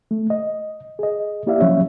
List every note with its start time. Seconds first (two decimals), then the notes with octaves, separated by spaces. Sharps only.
0.11 A3
0.30 D#5
0.99 G#4 D#5
1.47 A#3 E4 G4 D5 E5 F5
1.60 F3 F#3 C#4 C#5 E5